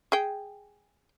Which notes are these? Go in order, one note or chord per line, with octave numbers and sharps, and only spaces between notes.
G#4 G5